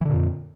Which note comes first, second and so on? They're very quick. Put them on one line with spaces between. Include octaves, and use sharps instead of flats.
E3 D3 A#2 F2